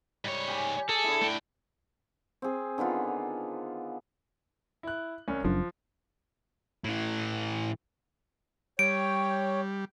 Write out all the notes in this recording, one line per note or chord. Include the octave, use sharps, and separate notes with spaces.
G#2 G3 C#5
G4 G#5 B5
G#4 A4
D3 E4
A3 G5
C4 G#4
D3 D#3 B3 F4
E4 F#6
C2 C#4
F#1 F#2 F3 D4
A2 E3
G3 C#5 G5 D7